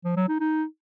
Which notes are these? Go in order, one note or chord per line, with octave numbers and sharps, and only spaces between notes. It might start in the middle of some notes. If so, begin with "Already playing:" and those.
F3
F#3
D#4
D#4